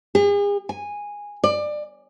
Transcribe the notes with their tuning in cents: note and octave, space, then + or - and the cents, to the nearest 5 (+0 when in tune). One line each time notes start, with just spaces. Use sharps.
G#4 -40
G#5 -10
D5 +25